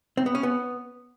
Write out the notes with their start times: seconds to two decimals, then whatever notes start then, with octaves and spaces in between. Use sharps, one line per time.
0.17 C4
0.26 B3
0.35 C#4
0.43 B3